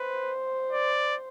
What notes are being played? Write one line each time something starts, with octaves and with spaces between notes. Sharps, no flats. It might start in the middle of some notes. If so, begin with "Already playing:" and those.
Already playing: B4 C5
D5